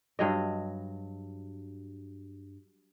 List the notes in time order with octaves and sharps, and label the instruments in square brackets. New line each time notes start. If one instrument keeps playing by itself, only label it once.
[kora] G2 F#3 D#5